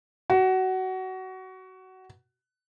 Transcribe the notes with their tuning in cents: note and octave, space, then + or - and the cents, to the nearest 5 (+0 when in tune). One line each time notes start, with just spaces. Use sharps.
F#4 +20